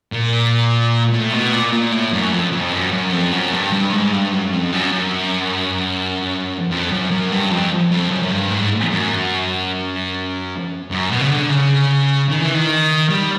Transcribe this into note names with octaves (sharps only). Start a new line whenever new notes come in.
A#2
A2
B2
A#2
A#2
A2
F#2
F2
F2
F#2
F#2
F2
F#2
G2
G2
G#2
G2
F#2
F2
F#2
F#2
F2
F#2
F#2
G2
F2
F2
F#2
F#2
G2
G#2
F#2
F#2
B2
C#3
D3
C#3
D#3
E3
D#3
G3